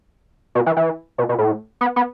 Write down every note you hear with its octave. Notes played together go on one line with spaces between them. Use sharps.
B2
E3
E3
B2
B2
A2
B3
B3